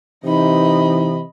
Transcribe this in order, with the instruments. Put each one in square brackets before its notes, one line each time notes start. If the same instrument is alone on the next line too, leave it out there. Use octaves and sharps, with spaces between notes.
[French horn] C3 [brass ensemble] E3 [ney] D#4 [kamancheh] D#5 B5